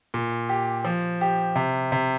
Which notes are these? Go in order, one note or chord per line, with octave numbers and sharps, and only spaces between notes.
A#2
G4
F3
G4
C3
C3